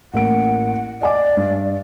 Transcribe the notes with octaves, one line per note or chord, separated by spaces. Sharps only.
A1 A#3 F#5 D7
D5 D#5 G#5 D6
G2